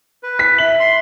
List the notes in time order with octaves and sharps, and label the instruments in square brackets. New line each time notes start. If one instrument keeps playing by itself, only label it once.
[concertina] B4
[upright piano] B6
[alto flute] E5 [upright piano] F#7
[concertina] C6